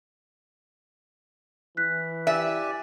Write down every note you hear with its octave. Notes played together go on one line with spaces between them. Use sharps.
E3 F#6 B6
G4 D5 E5 G#5